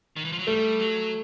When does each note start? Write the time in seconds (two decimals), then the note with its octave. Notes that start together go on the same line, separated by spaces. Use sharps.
0.16 D#3
0.25 E3
0.32 F3
0.39 F#3
0.46 G3 A3
0.79 F#3